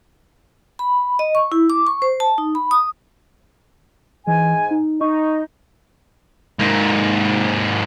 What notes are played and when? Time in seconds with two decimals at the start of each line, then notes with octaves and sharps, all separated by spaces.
0.79 B5
1.19 D#5
1.35 C#6
1.52 E4
1.70 D6
1.87 C#6
2.02 C5
2.20 A5
2.38 D#4
2.55 B5
2.71 D#6
4.27 G#2 E3 G#5
4.71 D#4
5.01 D#4 C#6
6.60 G#2 A#3